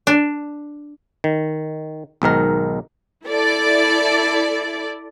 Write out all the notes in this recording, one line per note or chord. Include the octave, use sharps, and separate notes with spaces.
D4
D#3
B1 G#2 D#3 A#4
E4 A4 D5